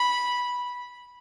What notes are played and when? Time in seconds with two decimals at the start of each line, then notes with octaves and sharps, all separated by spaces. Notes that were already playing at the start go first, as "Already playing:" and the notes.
Already playing: B5